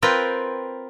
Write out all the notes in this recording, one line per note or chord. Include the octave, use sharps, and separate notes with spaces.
C4 F4 A#4 B4 G5